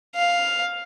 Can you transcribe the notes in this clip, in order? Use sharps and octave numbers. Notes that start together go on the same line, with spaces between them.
F5